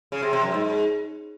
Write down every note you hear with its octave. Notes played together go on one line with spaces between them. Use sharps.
C#3
C3
C3
F#2
G#2